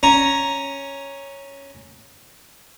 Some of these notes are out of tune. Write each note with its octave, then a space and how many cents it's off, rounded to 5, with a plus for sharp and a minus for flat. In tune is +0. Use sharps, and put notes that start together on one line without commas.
C#4 +0 A#5 +0